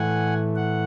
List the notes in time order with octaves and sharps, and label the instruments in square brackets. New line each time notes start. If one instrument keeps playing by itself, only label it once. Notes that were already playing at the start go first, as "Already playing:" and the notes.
Already playing: [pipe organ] A2 E3 A3 F#5 G#5
F#5